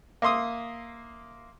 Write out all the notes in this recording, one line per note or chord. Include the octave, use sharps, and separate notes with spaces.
A#3 E5 C6 D#6